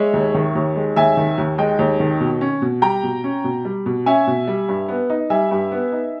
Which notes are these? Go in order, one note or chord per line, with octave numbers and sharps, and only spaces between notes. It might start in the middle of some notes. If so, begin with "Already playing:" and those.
Already playing: G#3 C#5 E5
D#2
D#3
D#2
G#3
D#2 E5 G#5
D#3
D#2
G#3 D#5 G5
D#2
D#3
B2
C#4
B2
G3 G5 A#5
B2
C#4
B2
G3
B2
C#4 E5 G#5
B2
G3
G2
B3
D#4
G3 E5 G#5
G2
B3
D#4